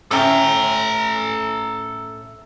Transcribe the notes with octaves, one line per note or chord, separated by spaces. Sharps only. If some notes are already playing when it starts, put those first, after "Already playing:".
A2 C#4 A4 G5 A#5